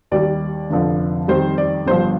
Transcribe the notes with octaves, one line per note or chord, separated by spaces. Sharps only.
D#2 D#3 G3 D5
F1 F2 D3 F3
F2 D#3 G3 C5
D5
G1 G2 F3 C5